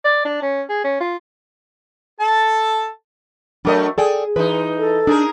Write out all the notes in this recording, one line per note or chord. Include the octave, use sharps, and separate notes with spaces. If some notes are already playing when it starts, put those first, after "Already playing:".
D5
D4
C#4
G#4
C#4
F4
A4 A5
F#3 A3 D4 A#4 D#5
G#4 A4 D5 G5
E3 D#4 B4
A4
D4 D#4 G#4 A#4